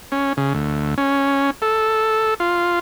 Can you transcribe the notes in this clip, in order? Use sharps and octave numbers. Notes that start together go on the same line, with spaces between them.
C#4
C#3
D2
C#4
A4
F4